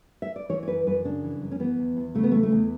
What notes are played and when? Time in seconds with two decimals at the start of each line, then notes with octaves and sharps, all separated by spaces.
0.22 E5
0.36 D5
0.49 E3 C#5
0.63 C#5
0.68 F#2 B4
0.87 F#2 B4
1.05 C#3 D4
1.23 E3
1.42 F#2
1.52 C#4
1.59 E3 B3
1.79 E2
1.97 E2
2.15 C#3 A3
2.23 B3
2.32 E3 A3
2.43 A3
2.52 E2